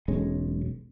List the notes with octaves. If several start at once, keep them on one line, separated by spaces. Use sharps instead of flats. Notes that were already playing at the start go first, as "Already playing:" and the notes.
E1 B1 G#3 C#4